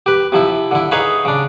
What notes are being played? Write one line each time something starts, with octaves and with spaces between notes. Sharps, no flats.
G4 B4
C3 F3 E4
D3 E4
D#4 G#4 B4 C#5 F5 B5
C#3 D4